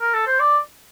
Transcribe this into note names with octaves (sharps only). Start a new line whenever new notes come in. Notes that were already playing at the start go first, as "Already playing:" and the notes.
A#4
A4
C5
D5